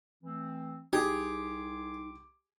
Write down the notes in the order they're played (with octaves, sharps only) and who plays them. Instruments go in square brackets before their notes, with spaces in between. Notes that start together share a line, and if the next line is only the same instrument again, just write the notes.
[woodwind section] E3 A3 C4
[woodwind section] C2 C6 D6 [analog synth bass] D#4 [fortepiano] G4 [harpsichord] G#4